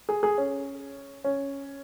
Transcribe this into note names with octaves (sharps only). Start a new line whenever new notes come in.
G#4
G#4
C#4
C#4